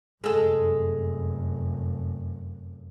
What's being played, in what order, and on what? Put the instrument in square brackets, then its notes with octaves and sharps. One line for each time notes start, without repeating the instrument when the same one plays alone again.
[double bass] F1 F#2 [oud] G#3 A4